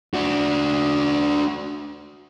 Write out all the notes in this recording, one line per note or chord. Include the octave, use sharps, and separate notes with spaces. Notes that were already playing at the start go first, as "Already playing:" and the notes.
D4 F#4